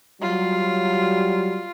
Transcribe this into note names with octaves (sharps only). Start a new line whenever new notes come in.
F#3 G3 F4